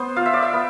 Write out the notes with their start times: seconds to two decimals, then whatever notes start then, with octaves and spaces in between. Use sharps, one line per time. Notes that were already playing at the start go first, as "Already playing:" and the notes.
Already playing: B3 C5
0.16 F4 F5
0.26 E5
0.34 D5
0.42 E5
0.53 B3